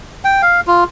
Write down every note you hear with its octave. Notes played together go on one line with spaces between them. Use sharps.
G5
F5
F4